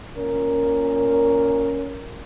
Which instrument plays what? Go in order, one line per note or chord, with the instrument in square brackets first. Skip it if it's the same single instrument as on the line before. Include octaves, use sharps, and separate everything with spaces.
[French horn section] A#2 C#4 A#4